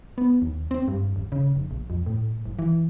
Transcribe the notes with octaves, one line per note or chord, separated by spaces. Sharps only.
B3
D#2
C4
G2
D#1
C#3
F1
A#1
F2
A2
F#1
E3